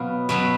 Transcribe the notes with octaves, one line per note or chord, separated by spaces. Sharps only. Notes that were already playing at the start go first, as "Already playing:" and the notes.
Already playing: B2 F#3 B3 F5
B2 F#3 B3